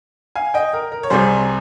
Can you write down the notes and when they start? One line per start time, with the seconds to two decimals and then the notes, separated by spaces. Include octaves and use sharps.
0.36 F5 G#5
0.54 D#5 G5
0.73 A#4
0.92 A#4
1.03 C#5
1.10 C2 C3 G3 G#4 C5